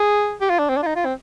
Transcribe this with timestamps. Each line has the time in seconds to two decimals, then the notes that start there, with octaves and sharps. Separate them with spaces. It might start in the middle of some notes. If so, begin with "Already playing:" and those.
Already playing: G#4
0.41 G4
0.50 F4
0.59 D4
0.69 C4
0.77 D4
0.82 F4
0.86 D#4
0.96 F4
1.05 C4